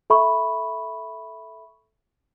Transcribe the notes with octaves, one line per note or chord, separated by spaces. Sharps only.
A4 E5 B5 C#6